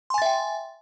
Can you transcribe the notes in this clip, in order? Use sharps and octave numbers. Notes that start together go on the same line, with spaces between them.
E5 G5 G#5 C6 A6